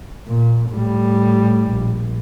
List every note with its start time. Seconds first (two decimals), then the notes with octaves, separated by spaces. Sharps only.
0.28 A#2
0.70 A2 G3
1.72 A#1